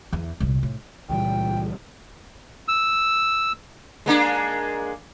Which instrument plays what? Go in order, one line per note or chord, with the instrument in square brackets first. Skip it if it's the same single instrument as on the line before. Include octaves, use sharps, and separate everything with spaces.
[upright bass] E2
C2 A#2
A2
[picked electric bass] C#2 E3 G3 [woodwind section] A#2 [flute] G5
[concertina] E6
[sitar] G#3 A#3 D4